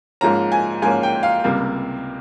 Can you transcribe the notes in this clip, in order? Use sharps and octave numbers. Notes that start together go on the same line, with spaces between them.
G#2 F3 A#3 C#4 A#5
G#5
G#2 F3 A#3 C#4 G#5
G5
F5
C#2 C3 G3 A#3